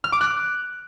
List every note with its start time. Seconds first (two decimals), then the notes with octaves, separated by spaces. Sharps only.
0.04 F6
0.12 D6
0.21 F#6